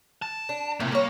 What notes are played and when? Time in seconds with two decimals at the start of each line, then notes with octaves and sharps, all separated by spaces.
0.22 A5
0.49 D4
0.80 A2 C3 A3 A#3
0.92 G3 A#3 C#5